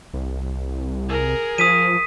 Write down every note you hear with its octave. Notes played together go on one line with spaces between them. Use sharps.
C2
G#4 A#4
F3 D#6 B6 D#7